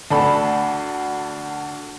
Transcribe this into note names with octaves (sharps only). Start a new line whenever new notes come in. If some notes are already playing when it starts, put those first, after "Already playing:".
D2 D4 A4 B5